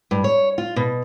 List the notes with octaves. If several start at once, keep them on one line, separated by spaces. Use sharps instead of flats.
G2
C#5
F4
B2